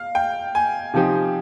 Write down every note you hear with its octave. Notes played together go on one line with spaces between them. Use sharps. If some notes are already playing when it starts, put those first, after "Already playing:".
Already playing: F5
G5
G#5
C3 F3 C4 D#4 G4